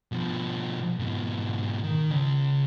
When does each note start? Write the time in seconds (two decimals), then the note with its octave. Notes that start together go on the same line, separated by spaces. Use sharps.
0.12 B2 F3
0.99 G#2 B2
1.83 D#3
2.11 C#3 D#5